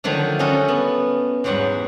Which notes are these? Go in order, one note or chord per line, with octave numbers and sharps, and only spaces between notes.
D3 D#3 F3 F#3 A3
G3 C#4 D#4 F#4 A4
B3
E2 G#2 F#3 G3 F#5